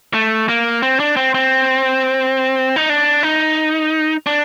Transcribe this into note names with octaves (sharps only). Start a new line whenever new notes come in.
A3
A#3
C4
D4
C4
C4
D#4
D4
D#4
D4